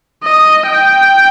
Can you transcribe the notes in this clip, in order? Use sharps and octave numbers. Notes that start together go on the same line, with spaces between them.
D#5
G5